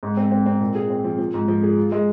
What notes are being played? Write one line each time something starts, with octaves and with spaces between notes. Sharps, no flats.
G#2
C4
C4
C4
A#2
G#4
C4
F3
F3
G#2
F3
G#4
F4
G#3